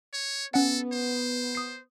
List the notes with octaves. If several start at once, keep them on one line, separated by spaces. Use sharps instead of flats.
C#5
B3 C#4 A4 F#5
C5
D#6 C7